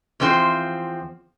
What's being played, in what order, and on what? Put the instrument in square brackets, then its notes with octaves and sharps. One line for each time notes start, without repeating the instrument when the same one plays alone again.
[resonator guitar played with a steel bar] E2 F3 C4 F4 C5